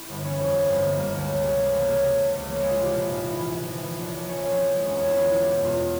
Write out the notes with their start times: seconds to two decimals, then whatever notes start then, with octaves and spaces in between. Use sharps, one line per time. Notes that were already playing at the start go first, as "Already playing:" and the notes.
Already playing: E4
0.09 G1
0.24 E3 C#4
0.39 F2
0.54 G1
0.69 G1 C4
0.84 G1 A#3
0.99 G1 A#3
1.14 C#2 G#3
1.29 C#2
1.37 A#3
1.44 C3
1.59 E3 A#3
1.74 C#2
1.81 A#3
1.88 C3
2.03 C3
2.19 C#2
2.33 C#2
2.49 E3 A#3
2.60 E3 G#3
2.71 F4
2.79 C3 G4
2.94 A#1 F4
3.09 G#2
3.16 E4
3.24 E3
3.38 E3
3.54 A#1
3.68 E3
3.84 E3
3.99 A#1
4.14 A#1
4.29 E3 C#4
4.44 A#1
4.51 C4
4.58 A#1
4.74 E3 G#3
4.86 E2 C#4
4.96 C#4
5.04 E2 E4
5.18 E3 F4
5.33 E3
5.41 G4
5.49 E1
5.63 E2 F4